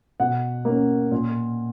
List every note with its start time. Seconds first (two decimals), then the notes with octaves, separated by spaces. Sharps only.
0.20 B2 F#5
0.65 A#3 C#4
1.11 A#2